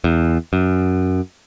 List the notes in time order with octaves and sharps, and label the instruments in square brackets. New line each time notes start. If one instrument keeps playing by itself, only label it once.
[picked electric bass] E2
F#2